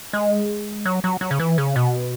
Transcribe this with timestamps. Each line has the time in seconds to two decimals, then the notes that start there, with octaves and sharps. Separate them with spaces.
0.13 G#3
0.86 F#3
1.04 F#3
1.21 F#3
1.31 C#3
1.40 E3
1.58 C#3
1.76 B2